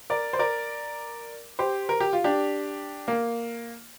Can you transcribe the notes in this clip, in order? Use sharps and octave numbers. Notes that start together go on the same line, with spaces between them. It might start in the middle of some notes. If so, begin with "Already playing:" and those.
A#4 D5
C5
A#4 D5
G4 C5
A#4
G4
F4
D4 G4
A#3